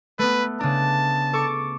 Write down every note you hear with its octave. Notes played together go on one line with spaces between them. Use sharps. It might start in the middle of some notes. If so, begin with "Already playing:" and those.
A3 B3 B4
C#3 D4 A5
A4 C#6 D6